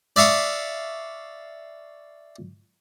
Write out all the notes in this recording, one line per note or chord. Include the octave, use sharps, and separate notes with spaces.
D5 E5 F5 C#6 D#6